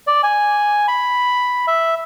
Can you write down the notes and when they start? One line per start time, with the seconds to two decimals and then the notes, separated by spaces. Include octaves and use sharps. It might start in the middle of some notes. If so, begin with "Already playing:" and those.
0.07 D5
0.23 G#5
0.88 B5
1.67 E5